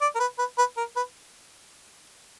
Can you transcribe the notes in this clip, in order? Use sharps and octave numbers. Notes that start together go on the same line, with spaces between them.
D5
A#4
B4
B4
B4
A#4
B4